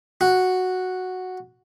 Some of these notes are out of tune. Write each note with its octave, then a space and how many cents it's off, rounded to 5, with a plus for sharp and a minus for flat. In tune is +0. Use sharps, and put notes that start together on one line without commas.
F#4 -5